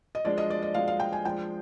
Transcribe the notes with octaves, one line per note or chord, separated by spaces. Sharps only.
D#5
F3 G#3 D4 D5
D#5
D5
D#5
F3 G#3 D4 F5
F5
G5
G#5
F3 G#3 D4 G5